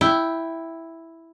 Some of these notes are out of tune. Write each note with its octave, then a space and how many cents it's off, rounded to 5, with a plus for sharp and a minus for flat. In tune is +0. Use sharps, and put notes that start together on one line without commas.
E4 +0 G5 +0